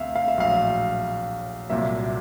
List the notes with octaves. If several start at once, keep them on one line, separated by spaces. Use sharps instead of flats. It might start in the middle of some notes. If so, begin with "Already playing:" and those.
Already playing: D2 C3 B3 E5 F5
F5
E5
A#1 A2 F#3 F5
C2 A#2 F#3 A#3 E5